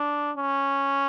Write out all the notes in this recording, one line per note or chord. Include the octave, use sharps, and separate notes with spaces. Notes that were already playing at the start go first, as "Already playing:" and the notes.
Already playing: D4
C#4